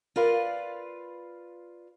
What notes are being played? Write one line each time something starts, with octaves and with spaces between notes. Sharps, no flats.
F4 A#4 B4 D5 F5